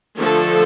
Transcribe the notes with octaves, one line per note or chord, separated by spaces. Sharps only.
D3 F3 A3 A4